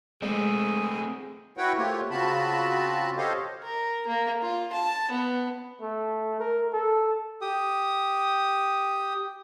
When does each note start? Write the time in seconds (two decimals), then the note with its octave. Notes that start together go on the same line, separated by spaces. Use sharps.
0.22 G#3 A3 C4 G#4
1.57 E4 F#4 B4 C#5 F#5 G5
1.77 A3 A#3 C4 F4 G4 C#5
2.11 C#3 C4 F4 F#4 A5 B5
3.17 G4 A4 C5 C#5 D#5 F5
3.62 A#4
4.07 A#3
4.42 F4
4.72 A5
5.11 B3
5.81 A3
6.40 A#4
6.72 A4
7.41 G4 D#6